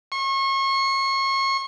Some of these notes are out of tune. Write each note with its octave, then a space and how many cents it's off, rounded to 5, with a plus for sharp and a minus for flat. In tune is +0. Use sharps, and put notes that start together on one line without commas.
C#6 -35